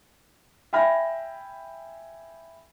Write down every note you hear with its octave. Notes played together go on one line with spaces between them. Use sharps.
E5 G5 G#5 B5 F6 A#6